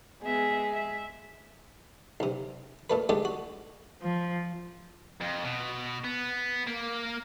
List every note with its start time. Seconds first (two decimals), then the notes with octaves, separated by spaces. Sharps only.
0.22 G#3 B3 E5
0.74 E5
2.20 B1 C3
2.90 A#2 A3 B4
3.09 D3 G#3 A3 G4 A4
3.25 F#4
4.02 F3
5.21 F2
5.45 B2
6.04 B3
6.67 A#3